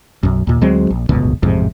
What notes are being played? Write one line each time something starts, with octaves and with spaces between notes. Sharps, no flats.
B1 F#2
D#2 A#2
D2 F#3 G#3 C4
A#1
D1 G1 C#2 B2
A1 F2 G#2 C3